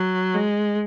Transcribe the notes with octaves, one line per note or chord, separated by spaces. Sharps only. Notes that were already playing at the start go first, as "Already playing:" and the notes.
Already playing: F#3
G#3